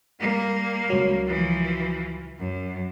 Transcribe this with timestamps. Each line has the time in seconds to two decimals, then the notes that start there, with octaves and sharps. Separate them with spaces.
0.20 G3 A#3
0.90 C#2 F#3
1.26 E3 F3
2.39 F#2